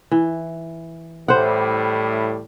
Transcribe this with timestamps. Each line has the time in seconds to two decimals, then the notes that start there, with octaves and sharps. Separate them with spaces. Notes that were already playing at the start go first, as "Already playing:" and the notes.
0.11 E3
1.28 A2 G3 C5 F#5